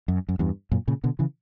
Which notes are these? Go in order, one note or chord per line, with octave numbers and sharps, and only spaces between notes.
F#2
F#2
E2 G2
F#2 A#2
A#2 C#3
B2 D3
C#3 E3